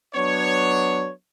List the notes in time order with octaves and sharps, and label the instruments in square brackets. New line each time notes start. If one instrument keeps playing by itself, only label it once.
[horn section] F#3 B3 D4 C#5